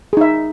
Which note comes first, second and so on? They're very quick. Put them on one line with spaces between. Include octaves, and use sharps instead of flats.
G#4 D#4 E5